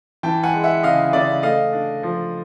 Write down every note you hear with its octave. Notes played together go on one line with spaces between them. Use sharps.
E3 G5 A5
F#5 G#5
G#3
E5 F#5
C#3 D#5 F5
C#3 D5 E5
A3 D#5 F5
D4
F3